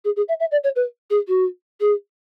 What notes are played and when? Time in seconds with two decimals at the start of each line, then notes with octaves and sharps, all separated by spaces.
0.05 G#4
0.16 G#4
0.28 E5
0.40 E5
0.51 D5
0.64 C#5
0.76 B4
1.10 G#4
1.28 F#4
1.81 G#4